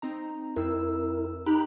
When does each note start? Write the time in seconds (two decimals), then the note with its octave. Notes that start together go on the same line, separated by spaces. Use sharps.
0.02 C4 D#4 A#5
0.56 F2 C4 E4 A#4 E6
1.46 D#4 G4 A#5 B5 F#6